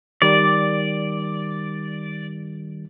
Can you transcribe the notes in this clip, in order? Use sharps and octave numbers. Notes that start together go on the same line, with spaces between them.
D#3 G3 D5